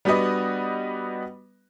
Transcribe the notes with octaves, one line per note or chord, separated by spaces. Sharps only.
G3 B3 D4 F#4 B4 D#5